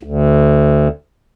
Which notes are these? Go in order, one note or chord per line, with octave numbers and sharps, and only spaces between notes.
D2